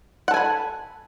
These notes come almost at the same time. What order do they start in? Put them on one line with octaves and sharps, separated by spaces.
F#5 A4 G#5 B5